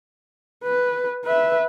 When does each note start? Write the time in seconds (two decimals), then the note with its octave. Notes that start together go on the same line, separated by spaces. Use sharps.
0.64 B4
1.25 B4 E5